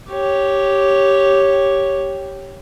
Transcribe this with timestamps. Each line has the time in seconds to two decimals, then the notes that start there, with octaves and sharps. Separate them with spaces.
0.11 G4 C#5